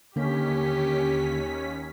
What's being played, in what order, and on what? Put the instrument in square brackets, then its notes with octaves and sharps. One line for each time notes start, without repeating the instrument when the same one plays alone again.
[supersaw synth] D#2 C#4 B6 [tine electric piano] D3 A#3 [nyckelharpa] G4